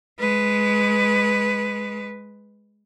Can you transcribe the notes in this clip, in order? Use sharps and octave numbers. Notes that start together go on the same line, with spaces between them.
G#3 B4